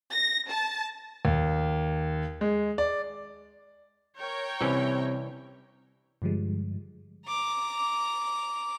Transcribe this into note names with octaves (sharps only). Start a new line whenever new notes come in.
A#6
A5
D#2
G#3
D5
A#4 C#5 G5
C2 C3 E3 C#4
G2 D3 F3 G3 G#3
A#5 D6